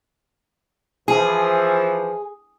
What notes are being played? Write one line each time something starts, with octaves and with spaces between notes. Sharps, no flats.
E3 F3 G#4